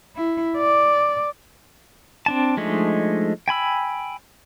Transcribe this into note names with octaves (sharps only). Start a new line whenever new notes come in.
E4
D5
C4 D4 A5
F3 G#3 A3 D4 D#4
G5 G#5 B5 E6